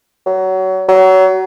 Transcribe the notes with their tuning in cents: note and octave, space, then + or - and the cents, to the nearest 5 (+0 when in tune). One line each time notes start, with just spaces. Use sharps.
F#3 +25
F#3 +25